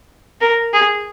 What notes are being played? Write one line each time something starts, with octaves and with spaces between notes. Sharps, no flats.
A#4
G#4